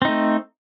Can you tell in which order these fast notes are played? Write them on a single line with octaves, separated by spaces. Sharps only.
C4 D#4 A3